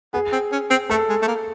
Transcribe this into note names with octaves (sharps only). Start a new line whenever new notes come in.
B3 G#4
C4
C#4
C4
A3 A4
G#3
A3
A#3